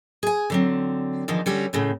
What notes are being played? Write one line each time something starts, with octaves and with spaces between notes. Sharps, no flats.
G#4 G#5
D3 F#3 C4
E2 D3 D#3 F3
D3 G3 C#4 F#4
D#2 A2 C#3